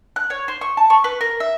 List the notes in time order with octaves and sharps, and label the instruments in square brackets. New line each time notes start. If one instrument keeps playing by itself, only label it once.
[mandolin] F#6
C#5
C5
C#6
A5
C#6
B4
A#4
E5